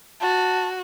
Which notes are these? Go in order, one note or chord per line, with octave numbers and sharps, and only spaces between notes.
F#4 A5